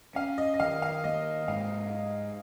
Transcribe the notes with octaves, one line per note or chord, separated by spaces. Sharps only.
C#4 F5
D#5
D#5
D#3 F5
F5
A#3 D#5
G#2 F5